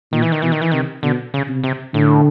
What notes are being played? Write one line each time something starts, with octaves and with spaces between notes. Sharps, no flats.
A#2 D#3
E3
D#3
B2 E3
D#3
E3
C3 D#3
B2 D3
C#3
C3
C3
A2 D3